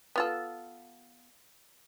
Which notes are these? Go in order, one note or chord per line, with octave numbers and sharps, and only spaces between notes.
B3 F4 A4